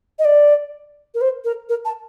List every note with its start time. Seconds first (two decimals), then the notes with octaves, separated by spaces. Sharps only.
0.19 D#5
0.25 D5
1.14 A#4
1.21 C5
1.44 A#4
1.69 A#4
1.85 A5